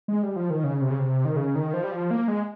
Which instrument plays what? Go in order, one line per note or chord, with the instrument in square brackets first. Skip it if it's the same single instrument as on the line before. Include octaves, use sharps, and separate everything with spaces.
[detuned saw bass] G#3
G3
F3
D#3
C#3
C3
C#3
C3
D#3
C#3
D#3
F3
G3
F3
A#3
G#3